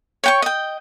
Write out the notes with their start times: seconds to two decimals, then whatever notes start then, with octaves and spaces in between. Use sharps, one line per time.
0.24 C#5 G5 C#6
0.42 D#5 G5